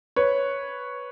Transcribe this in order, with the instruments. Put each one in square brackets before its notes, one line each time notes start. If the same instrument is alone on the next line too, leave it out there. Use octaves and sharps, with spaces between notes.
[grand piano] B4 C#5